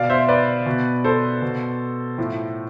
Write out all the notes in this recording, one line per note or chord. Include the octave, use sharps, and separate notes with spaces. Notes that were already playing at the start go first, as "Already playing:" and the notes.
Already playing: B2 D5 F5
C5 E5
B4 D5
B2
A4 C5
B2
A2 F3